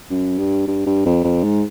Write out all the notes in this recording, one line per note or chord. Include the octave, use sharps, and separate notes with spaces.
F#2
G2
G2
G2
F2
F2
G#2